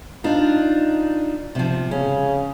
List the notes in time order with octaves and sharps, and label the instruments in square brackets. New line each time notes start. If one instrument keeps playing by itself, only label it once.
[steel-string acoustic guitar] D4 D#4 F4
C3 F3
[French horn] C#3 [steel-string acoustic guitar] C#4